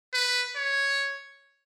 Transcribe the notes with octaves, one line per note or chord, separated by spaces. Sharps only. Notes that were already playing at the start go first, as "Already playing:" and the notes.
B4
C#5